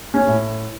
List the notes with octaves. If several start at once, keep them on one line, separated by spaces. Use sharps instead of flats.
C#4
A2